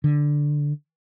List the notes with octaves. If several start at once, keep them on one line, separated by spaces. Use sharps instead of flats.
D3